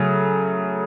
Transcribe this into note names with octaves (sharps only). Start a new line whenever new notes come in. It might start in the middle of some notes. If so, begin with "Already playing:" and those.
Already playing: C#3 F#3 A3